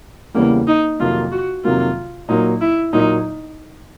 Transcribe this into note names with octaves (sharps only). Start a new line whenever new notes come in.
E2 C#3 E3 G3 A#3
D#4
F2 C3 D#3 F#3 A#3 F4
F#4
F2 C3 D#3 F#3 A#3 F4
A#2 F#3 A#3 D#4
E4
A#2 F#3 A#3 D#4